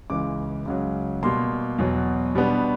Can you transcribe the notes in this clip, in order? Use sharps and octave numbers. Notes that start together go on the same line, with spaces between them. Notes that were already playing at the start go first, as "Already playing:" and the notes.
C#2 C#3 E3 D6
C#2 C#3 F#3
B2 G3 A#3 C6
E2 B2 F#3
B2 G3 B3 D4